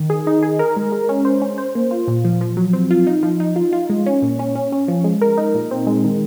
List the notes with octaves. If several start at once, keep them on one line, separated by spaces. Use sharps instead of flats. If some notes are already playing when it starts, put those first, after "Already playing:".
Already playing: D#3
G#4
D#4
G#4
A#4
G#3
G#3
C#4
C5
C#4
C5
A#3
F4
A#2
F3
F3
F#3
C4
F4
D#4
F3
D#4
F4
F4
G#3
C#4
A#2
C#4
C#4
C#4
F3
G#3
A#4
D#4
A#2
C4
G#3
D#3